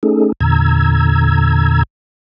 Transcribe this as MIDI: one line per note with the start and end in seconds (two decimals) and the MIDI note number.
0.03 0.32 57
0.03 0.32 61
0.03 0.32 63
0.03 0.32 68
0.03 0.32 69
0.41 1.83 40
0.41 1.83 46
0.41 1.83 50
0.41 1.83 82
0.41 1.83 88
0.41 1.83 92